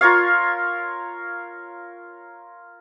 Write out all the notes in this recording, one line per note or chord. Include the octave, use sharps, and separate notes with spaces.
F4 A#4 C#5 F5